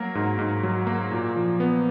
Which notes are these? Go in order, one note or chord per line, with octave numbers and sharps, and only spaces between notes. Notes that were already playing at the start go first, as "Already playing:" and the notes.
Already playing: F#3 A#3 A#4
G#2
G#2
F#3
A#3
A#2
F3
B3